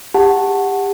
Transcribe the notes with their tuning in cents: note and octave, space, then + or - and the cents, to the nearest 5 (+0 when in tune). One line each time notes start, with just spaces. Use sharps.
G4 +25 F#5 +0 A5 +0